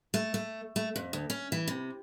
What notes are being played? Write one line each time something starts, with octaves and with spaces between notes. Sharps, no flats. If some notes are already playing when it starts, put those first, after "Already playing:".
A3
A3
A3
F2
D2
C#4
E3
C3